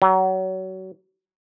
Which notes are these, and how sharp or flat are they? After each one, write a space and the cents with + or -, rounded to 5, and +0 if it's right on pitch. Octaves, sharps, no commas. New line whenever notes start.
F#3 +30